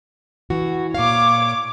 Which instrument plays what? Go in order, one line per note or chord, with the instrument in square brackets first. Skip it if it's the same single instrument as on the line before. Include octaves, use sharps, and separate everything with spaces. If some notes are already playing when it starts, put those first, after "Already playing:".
[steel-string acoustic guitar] E3 F#4
[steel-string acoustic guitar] A#2 F5 [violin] C#5 D6